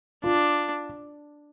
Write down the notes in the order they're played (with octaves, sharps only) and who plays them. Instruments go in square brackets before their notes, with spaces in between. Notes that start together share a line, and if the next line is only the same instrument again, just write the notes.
[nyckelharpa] D4 [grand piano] F4